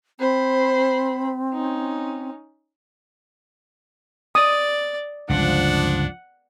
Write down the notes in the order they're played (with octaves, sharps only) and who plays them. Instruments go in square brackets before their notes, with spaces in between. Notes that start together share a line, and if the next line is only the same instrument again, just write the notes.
[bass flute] C4 [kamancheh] C5 B5
[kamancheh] C#4 D#4
[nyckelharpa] D5 [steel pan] D#6
[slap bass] G1 C#2 [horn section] F3 D4 [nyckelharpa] F#5